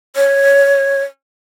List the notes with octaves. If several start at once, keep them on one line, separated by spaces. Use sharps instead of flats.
C#5